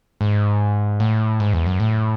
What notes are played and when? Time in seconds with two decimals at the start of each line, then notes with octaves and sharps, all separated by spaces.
0.21 G#2
1.00 A2
1.40 G#2
1.53 E2
1.66 F#2
1.80 A2